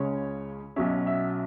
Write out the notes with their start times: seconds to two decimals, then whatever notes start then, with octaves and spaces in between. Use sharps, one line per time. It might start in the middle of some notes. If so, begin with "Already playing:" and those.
Already playing: C#2 C#3 G#3 C#4 C#5
0.76 B1 B2 F#3 C#4 E5
1.07 E5